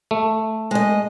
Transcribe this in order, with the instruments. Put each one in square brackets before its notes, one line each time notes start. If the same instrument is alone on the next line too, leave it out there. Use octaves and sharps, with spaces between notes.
[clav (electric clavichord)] A3
[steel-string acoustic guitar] G#3 D#5